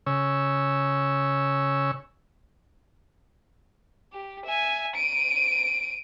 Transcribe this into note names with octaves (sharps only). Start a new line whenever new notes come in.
C#3 C#5 E6
G4
E5 G#5
D7 D#7